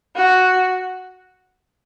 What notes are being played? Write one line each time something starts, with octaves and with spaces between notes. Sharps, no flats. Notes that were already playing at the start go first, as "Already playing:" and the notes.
F#4